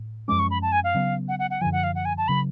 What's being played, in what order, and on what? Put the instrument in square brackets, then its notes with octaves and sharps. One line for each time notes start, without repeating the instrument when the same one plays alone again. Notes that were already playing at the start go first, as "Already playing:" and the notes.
Already playing: [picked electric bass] A2
[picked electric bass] F#2 F3 G#3 C#4 [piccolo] D6
[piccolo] C#6
B5
A5
G#5
F5
[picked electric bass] C#3 F#3 B3
[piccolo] F#5
F#5
F#5
[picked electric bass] F#2 D3 F3 [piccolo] G#5
[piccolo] F#5
F5
F#5
G#5
A5
[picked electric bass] C#3 F#3 [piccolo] B5